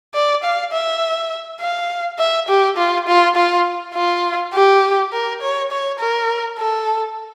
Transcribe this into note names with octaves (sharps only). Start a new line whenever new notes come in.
D5
F5
E5
F5
E5
G4
F4
F4
F4
F4
G4
A#4
C#5
C#5
A#4
A4